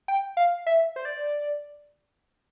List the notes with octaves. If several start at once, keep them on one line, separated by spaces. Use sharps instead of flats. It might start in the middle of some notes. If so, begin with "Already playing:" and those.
G5
F5
E5
C5
D5